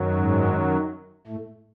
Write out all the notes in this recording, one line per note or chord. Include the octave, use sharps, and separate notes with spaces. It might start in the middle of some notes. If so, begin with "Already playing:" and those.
Already playing: F#2 D#3 F#3
G#2 G#3
A2 A3